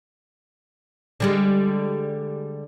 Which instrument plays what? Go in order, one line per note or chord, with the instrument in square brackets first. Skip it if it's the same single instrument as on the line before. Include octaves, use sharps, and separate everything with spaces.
[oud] D3 G3 G#3